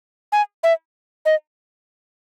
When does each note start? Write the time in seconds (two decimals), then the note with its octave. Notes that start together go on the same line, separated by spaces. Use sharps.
0.32 G#5
0.64 E5
1.25 D#5